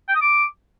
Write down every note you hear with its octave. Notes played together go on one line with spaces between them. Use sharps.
G5
D#6
D6